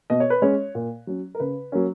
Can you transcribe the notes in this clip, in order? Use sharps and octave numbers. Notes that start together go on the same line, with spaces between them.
B2 D#5
C#5
B4
G#3 C#4 C#5
A#2
F#3 C#4
A#4
C#3 B4
F#3 A#3 C#4